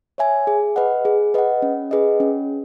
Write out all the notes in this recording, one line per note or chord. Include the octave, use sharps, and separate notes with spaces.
C#5 E5 G#5
G#4
B4 D#5 F#5
G#4
B4 D#5 F#5
C#4
G#4 B4 D#5
C#4